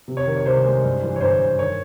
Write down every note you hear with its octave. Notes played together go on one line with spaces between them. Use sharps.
C3
C#5
D#3
C#5
C2 C5
G#3
G2
E3
C#5
G1 C5
G1
D#3 C#5